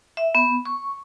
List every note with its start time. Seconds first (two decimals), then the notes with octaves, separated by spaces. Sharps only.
0.17 E5
0.35 B3
0.66 C#6